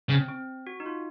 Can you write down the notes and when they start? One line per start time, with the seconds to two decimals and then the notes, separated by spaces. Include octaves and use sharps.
0.09 C#3 C4
0.28 C4
0.67 F#4
0.80 D#4
0.86 F4